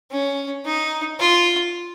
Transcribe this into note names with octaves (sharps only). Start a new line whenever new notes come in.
C#4
D#4
F4